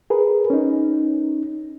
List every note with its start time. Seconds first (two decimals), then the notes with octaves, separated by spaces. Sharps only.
0.10 G#4 A#4 B4
0.50 C#4 D#4